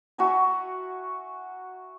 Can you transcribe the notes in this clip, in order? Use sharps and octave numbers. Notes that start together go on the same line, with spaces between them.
F#4 E5 G#5 A#5